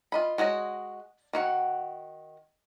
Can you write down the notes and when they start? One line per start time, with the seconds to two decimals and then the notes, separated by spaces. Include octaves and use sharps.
0.12 F4 D#5 B5
0.38 G#3 F#4 C#5 D#5
1.33 D#3 F#4 F#5